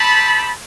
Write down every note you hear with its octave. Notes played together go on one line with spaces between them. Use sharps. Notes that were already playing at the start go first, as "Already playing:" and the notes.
Already playing: C4 D#4 G4 A5 B5